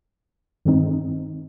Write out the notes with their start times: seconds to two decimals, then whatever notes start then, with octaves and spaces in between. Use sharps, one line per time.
0.65 G2 D#3 G#3 C4 D#4